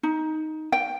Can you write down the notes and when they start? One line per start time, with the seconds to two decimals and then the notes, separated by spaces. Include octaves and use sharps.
0.03 D#4
0.72 G5